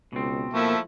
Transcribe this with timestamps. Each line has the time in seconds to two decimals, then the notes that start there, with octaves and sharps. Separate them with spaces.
0.13 C#2 B2 C4
0.53 F3 A3 A#3 E4